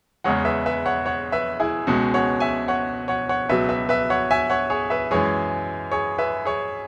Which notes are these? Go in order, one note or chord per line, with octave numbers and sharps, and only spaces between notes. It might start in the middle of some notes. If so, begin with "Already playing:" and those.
E2 C#3 G#3 C#5 F#5
B4 E5
B4 E5
C#5 F#5
C#5 F#5
B4 E5
E4 G#4
C#2 B2 G#3 C#4 F#4
C#5 F#5
E5 G#5
C#5 F#5
C#5 F#5
C#5 F#5
C#2 B2 F#3 B4 E5
B4 E5
B4 E5
C#5 F#5
E5 G#5
C#5 F#5
G#4 C#5
B4 E5
F#2 E3 G#3 G#4 C#5
G#4 C#5
B4 E5
G#4 C#5